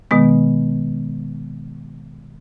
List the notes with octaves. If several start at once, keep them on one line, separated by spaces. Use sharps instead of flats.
B2 D#3 G#3 B3